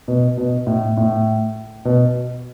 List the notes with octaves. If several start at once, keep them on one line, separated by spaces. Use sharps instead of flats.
B2
B2
A2
A2
B2